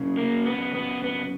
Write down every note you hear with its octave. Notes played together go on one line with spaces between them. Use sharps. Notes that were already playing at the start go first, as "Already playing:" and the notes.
Already playing: F#2 C#3
A#3
B3
B3
B3